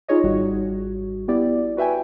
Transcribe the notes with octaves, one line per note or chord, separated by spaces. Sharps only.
D#4 F4 G#4 C#5 D#5
G#1 G3 F#4
B3 E4 G4 D5
F#4 B4 E5 G5 G#5